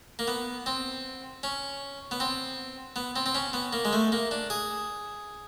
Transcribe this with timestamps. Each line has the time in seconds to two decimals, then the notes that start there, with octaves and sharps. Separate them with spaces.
0.19 A#3
0.27 B3
0.66 C4
1.43 C#4
2.11 B3
2.20 C4
2.96 B3
3.16 C4
3.26 C4
3.35 C#4
3.53 B3
3.73 A#3
3.85 G#3
3.93 A3
4.12 A#3
4.31 D4
4.50 G#4